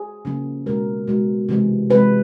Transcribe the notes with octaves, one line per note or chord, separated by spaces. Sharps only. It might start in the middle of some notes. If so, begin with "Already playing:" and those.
Already playing: G#4
C#3 F3 A#3
B2 G#3 A#4
B2 G#3
C3 E3 G#3
C3 E3 G#3 B4